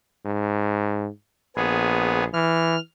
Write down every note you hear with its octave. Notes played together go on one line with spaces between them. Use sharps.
G#2
A#1 B3 G#4
E3 F6